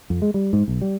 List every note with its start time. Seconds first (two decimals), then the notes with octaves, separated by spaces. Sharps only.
0.10 F2
0.22 G#3
0.34 G3
0.53 G#2
0.68 B1
0.81 G3